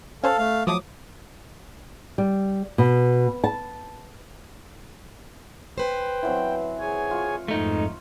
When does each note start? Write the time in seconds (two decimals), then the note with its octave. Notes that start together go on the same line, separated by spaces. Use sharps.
0.24 C#4 A4 C5 F5
0.38 A3 F5
0.67 F3 F#3 A3 D6 D#6
2.18 G3
2.78 B2
3.44 A5
5.78 B4 C5 G5
6.23 E3 F#3 C4
6.80 G#4 C#5 G#5
7.11 F4 C#6
7.48 F2 G#2 A3 D#4